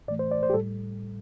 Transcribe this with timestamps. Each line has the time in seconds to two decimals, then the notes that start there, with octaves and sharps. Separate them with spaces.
0.08 A2 E3 A3 D5
0.19 C5
0.31 D5
0.43 C5
0.50 G4
0.54 A2 G3 A4